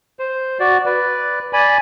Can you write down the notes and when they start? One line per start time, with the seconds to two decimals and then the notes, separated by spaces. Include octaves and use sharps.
0.19 C5
0.60 F#4 D5
0.86 B4 D5
1.53 D5 G#5 B5